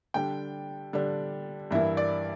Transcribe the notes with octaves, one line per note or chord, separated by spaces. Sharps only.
D3 G3 D4 G5
D3 G3 D4
G2 E3 A#3 E4 E5
D5